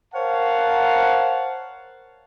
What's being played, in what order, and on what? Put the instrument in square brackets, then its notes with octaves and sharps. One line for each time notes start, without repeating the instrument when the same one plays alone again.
[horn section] A#4 C5 C#5 F5 F#5 A5